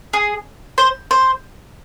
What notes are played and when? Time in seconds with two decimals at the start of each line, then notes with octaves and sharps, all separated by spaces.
0.13 G#4
0.78 C5
1.11 C5